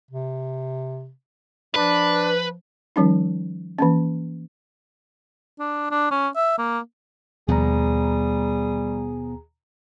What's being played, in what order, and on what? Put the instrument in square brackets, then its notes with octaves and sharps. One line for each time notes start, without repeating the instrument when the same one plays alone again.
[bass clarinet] C3
[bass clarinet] F3 [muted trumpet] D4 [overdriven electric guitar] B4
[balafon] D#3 F3 G3 C#4 D#4
E3 A#3 C#4
[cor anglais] D4
D4
C#4
E5
A#3
[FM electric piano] D#2 A#5 [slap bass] B2 F3 B3 [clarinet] G3 [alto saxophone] G#4